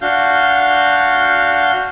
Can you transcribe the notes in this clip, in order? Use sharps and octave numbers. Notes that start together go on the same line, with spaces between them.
D4 F#4 F5 G6